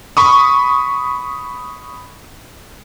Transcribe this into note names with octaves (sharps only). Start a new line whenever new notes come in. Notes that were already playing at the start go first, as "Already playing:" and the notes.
B5 C#6 D#6